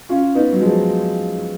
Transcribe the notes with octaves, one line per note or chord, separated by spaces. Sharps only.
C#4 F4
B3 D#4
F#3
F3 G#3